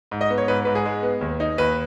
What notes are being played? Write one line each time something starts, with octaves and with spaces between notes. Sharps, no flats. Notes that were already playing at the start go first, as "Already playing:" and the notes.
G#2
D#5
B3
C#5
G#2 B4
G#2 B4
G#4
G#3
B3
D#2
D#4
D#2 B4